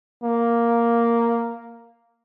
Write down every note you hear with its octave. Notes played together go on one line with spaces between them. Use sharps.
A#3